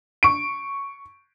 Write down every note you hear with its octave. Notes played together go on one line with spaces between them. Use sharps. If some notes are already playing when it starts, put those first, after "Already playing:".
C#6 D7